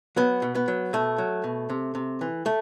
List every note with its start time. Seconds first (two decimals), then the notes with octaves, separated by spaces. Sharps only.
0.17 F#3 B3
0.42 B2
0.55 B3
0.68 F#3
0.93 B2 A3
1.18 F#3
1.44 B2
1.70 C3
1.95 C3
2.21 E3
2.46 A3